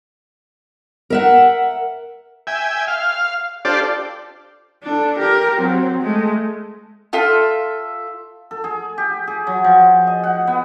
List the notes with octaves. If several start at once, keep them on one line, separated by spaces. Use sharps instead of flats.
A#4 E5 F#5
E5 G5 G#5
F5
D4 F4 G4 A4 C5 D5
D4 A4
G4 A#4
F#3 C4
G#3 A3
F4 A4 E5 G5
A4
G#4
G4
G#4
F#3
F3
D#5
F#5
B3